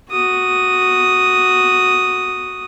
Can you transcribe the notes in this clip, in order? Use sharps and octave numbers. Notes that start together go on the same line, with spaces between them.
F#4 D#6